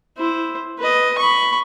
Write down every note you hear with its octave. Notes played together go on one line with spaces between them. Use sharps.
E4 C5
B4 D#5
B5 C#6